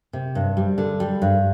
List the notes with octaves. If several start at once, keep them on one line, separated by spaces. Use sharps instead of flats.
C3
G2
G3
D3
G3
G2